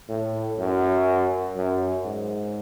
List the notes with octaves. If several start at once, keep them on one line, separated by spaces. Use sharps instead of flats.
A2
F#2
F#2
G#2